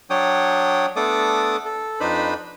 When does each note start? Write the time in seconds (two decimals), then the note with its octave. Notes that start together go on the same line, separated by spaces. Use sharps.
0.10 F#3 D4 C#5 G5 D#6
0.96 A3 B3 D4 A4 D6 D#6
1.65 A4
2.00 F2 D4 D#4 B4 C5 B5